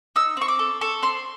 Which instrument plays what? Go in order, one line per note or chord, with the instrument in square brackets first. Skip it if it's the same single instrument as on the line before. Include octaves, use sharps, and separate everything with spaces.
[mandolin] D#4 E6
C4 C#6
D6
A4
A4 C#6
C4 C6